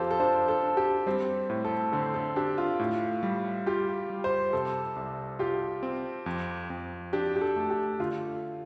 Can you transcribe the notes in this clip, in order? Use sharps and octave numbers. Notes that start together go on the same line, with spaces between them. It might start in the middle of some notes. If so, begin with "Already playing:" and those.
Already playing: F2 F4 G4 A4 C5
A4
D4 C5
A4
D4
G4
G3 C4
A2
A4
D3 C5
A4
D4 G4
F4
A2
G3
F4 G4
G3
C5
C3 A4
C2
F4 G4
C4
F2
F2
D4 G4
G4
A4
A3
G4
D3 F4